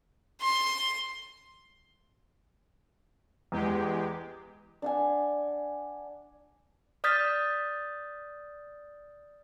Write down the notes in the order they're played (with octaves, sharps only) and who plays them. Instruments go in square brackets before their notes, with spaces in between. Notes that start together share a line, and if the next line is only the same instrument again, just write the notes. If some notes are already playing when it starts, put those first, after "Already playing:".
[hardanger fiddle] C6
[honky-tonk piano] E2 [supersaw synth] G#3 G4
[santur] D4 F#5 G#5
[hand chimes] D5 D#6 F6 G6 A6 B6